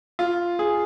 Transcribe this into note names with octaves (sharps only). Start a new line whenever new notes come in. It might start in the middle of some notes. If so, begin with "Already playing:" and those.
F4
G#4